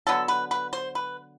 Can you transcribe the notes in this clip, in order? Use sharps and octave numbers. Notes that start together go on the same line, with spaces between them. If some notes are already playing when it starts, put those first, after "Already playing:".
D3 F#3 B3 A4
B4
B4
C5
B4